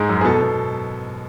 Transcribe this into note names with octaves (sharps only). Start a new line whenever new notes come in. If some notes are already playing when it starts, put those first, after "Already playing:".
Already playing: G#2 G#3 G#4
F#2
G#4
B2 A4
B2